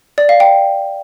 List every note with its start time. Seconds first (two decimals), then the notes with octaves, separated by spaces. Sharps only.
0.18 D5
0.29 F5
0.40 G5